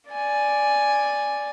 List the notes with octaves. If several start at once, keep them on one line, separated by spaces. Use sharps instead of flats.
D5 G#5